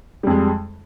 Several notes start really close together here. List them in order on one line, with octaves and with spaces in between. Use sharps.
G3 F2 G#3